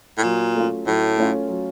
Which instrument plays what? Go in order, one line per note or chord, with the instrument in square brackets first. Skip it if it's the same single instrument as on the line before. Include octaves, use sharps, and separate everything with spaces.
[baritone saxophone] A2
[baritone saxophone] A#2 [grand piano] F#3
[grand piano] A3 C#4 F4
[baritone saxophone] A2 [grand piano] F#3
[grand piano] A3 C#4 F4
F#3